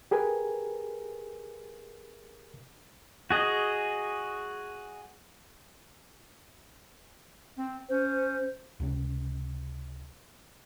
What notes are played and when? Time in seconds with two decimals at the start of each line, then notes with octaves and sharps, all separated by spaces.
0.11 G4 G#4 A#4 B4 G#5
3.30 F#4 G#4 D#5
7.56 C4
7.89 C#4 C5
8.80 C#2 C3 C#4